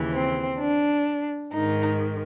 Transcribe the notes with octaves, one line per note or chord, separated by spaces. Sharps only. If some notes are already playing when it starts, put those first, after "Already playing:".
Already playing: D#2 C#3 E3
C4
D4
G#2 D#3 D#4